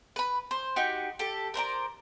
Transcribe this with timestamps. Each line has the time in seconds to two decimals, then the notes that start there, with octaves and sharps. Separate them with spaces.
0.16 B4 B5
0.51 C5
0.76 D#4 F#4 G4
1.19 G4 A4
1.54 A#4 C5 D5 A#5